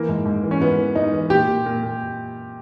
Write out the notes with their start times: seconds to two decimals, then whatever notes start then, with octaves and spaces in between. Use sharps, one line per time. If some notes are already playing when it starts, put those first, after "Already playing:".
Already playing: E3 A#3
0.09 G#2
0.26 G#2
0.43 E3
0.51 C#4
0.60 G#2 B3
0.78 E3
0.96 G#2 D#4
1.13 E3
1.30 A#2 G4
1.49 A#2
1.66 A#2
1.83 A#2